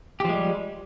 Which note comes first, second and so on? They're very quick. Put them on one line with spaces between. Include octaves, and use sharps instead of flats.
G4 F3 G#3 G3